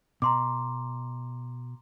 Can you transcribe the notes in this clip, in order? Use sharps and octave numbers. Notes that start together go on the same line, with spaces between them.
B2 A#5 C6 D6